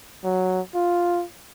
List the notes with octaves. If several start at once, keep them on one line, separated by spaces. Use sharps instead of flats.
F#3
F4